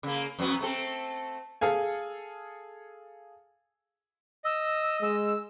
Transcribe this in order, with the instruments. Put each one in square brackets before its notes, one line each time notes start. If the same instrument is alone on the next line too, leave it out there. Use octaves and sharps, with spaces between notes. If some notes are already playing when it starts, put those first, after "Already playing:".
[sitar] C#3 A#3
F2 F#3 B3
A3 C4 A4
[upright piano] G#4 A4 F5 G#5
[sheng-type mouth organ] D#5 [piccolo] E6
[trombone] G#3 [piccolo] E6